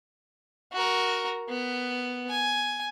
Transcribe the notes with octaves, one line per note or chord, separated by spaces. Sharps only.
F#4 A#4
B3
G#5